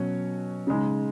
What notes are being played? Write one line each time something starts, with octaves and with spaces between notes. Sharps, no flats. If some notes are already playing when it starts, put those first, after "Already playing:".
Already playing: B2 F#3 C#4
C#3 G#3 D#4